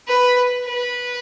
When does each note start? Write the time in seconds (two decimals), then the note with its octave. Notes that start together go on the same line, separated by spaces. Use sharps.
0.08 B4
0.65 B4